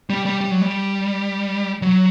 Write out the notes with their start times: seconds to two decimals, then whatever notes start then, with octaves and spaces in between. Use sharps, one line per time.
0.10 G3
0.26 G3
0.41 G3
0.51 F#3
0.62 G3
1.82 F#3